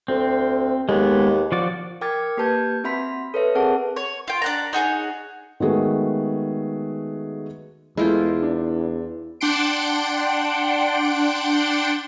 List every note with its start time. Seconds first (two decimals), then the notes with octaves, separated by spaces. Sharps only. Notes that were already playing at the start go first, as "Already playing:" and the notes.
0.08 D2 C4
0.89 D#2 G#3 B3
1.52 F3 F#4 D5
2.01 A#4 G5 D6 F6 G#6 A6
2.37 A#3 G4 B4 A5 G6 G#6
2.84 C4 F#4 E5 B5 C6 B6
3.34 A4 B4 C#5 E5
3.55 C4 G#4 A#4 F#5 A5
3.96 C#5
4.28 F4 G5
4.42 D4 F#5 A#5
4.73 D#4 F#4 G#4 C#5
5.60 D#3 G#3 A3 B3 F#4 G#4
7.97 E2 G#3 A3 E4 F4 C5
8.42 D4
9.41 D4 F#5 G5 C6 D7